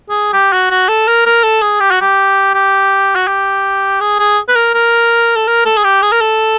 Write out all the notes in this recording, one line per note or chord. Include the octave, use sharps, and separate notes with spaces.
G#4
G4
F#4
F#4
A4
A#4
A#4
A4
G#4
G4
F#4
G4
G4
F#4
G4
G#4
G#4
B4
A#4
A#4
A4
A#4
A4
G#4
G4
G#4
A#4
A4